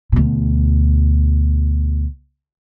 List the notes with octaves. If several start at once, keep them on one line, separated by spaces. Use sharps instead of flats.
D2 B2